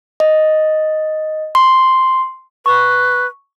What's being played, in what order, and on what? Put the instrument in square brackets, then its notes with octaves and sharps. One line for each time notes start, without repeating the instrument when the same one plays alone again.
[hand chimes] D#5
C6
[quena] B4 [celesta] C#6